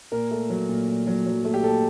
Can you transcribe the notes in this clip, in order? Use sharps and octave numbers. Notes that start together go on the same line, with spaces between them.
A#2 A#4
A3
F#3
A#2
A#2
F#3
F#3
A3
G4
A#2 A4